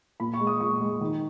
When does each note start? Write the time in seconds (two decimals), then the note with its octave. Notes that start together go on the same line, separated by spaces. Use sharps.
0.20 A#2 B5
0.34 C#6
0.40 G#3
0.47 D#6
0.60 A#2 C#6
0.80 G#3
1.01 D#3